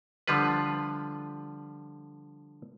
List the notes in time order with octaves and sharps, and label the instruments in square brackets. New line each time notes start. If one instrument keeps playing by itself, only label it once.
[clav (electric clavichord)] D3 F3 G3 F4 B4